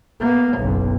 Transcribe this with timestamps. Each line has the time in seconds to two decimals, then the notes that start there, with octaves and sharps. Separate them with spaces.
0.20 A#3 B3
0.57 F#1 B1